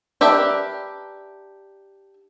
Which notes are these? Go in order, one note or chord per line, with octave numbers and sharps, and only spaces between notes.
D4 G4 A#4 B4 E5